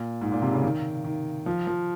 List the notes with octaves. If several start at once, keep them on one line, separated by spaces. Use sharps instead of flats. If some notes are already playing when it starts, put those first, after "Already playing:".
Already playing: A#2
G#2
A#2
C3
C#3
D#3
D#3
F3
F3